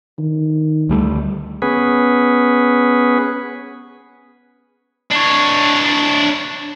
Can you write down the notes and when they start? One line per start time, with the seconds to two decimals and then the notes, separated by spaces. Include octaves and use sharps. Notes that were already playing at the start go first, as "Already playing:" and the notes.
0.18 D#3
0.89 D2 G3 A3
1.62 B3 C#4 G#4 B4
5.12 D4 C#5